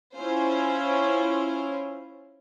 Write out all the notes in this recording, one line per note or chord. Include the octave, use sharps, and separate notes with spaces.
C#4 E4 F4 C5